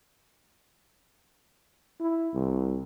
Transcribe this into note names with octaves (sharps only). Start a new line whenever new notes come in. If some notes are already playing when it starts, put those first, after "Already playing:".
E4
C2